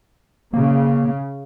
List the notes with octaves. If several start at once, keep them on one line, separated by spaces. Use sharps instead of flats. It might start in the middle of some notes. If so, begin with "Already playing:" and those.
C#3 A#3